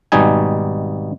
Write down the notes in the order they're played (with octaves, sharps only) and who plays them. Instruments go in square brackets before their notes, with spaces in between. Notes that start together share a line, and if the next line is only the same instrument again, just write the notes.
[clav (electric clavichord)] G#1 B2 G3 D#4 G#5